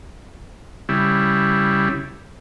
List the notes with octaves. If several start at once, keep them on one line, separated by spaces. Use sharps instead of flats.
C#3 G3 E4